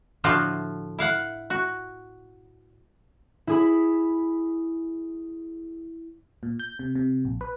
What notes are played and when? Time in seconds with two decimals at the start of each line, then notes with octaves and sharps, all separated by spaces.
0.24 A2 D3 F3 F4 F#4
0.99 E4 F5 F#5
1.50 F#4
3.47 E4 G#4 B5
6.43 A#2
6.59 G6
6.79 C3
6.95 C3
7.25 A#1
7.41 B4